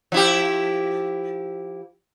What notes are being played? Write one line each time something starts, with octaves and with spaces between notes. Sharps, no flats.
F3 E4 G4